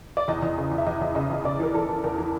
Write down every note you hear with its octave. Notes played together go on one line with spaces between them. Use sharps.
D5
E2 D#5
E2
C#3
E2
E5
E2 D#5
E2
C#3 D#5
E2
C#3 D5
E3 A#4
E3 A4
E3
E2 A#4
E3